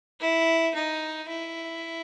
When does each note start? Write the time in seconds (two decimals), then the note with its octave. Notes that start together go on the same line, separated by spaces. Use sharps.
0.21 E4
0.75 D#4
1.29 E4